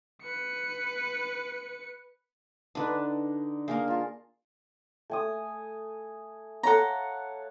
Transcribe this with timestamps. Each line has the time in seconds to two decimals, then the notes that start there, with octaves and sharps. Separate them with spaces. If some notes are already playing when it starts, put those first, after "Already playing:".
0.23 B4 C#7
2.75 D3 D4 D#4 B4
3.68 A#3 G#4 A#4 F5 G#5
3.88 F4 A5
5.10 A3 G#5 D#6
6.63 A4 C#5 F5 F#5 A#5